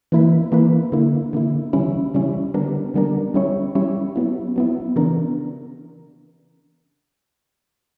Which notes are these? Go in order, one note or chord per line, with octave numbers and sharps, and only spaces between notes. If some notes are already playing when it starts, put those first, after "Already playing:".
E3 A#3 E4 B4
E3 A#3 E4 B4
D3 A#3 E4
D3 A#3 E4
C#3 E3 G3 C#4 E4
C#3 E3 G3 C#4 E4
D3 G3 B3 D4 A#4
D3 G3 B3 D4 A#4
G3 C#4 E4 G4 C#5
G3 C#4 E4 G4 C#5
F#3 B3 E4
F#3 B3 E4
C#3 E3 B3 D4 A#4